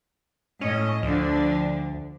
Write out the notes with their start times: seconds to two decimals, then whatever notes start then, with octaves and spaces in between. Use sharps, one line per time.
0.61 A2 C#4 D#5
1.03 D2 D3 F3 D4